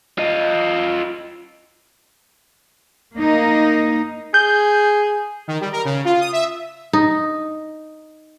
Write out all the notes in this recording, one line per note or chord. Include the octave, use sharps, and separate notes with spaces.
F4 D#5
A#3 D#4
G#4 G6
D#3
G3
A#4
C#3
F4
D#6
E5
D#4